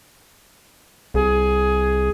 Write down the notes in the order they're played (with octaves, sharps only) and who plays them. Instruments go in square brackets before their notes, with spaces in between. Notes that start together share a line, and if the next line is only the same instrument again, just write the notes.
[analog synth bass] C2 [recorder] G#4